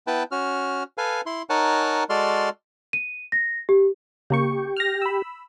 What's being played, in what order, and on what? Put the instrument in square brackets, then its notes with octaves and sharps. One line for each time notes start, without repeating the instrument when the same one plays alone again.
[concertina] B3 E4 B4 G5 A5
C#4 F#4 F6
A4 B4 F5 G#5
E4 C6
D#4 A#4 C#5 F#5 G#5 A5
G#3 F#4 A4 D5 C6 F6
[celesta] D#7
A#6
G4
[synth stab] C#3 A#3 C#6 [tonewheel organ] G4
[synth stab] F6 A#6
B5 E6